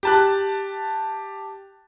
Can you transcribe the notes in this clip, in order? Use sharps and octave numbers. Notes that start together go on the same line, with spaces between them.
G4 A5 F#6